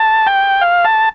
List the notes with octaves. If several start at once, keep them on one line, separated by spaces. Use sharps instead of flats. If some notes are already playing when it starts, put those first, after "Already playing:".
Already playing: A5
G5
F5
A5